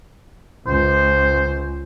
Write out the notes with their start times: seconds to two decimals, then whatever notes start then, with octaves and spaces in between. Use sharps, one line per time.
0.67 C#2 C5